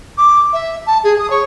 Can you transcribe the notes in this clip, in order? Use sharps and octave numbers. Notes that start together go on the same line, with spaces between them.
D6
E5
A5
G#4
D#6
C#5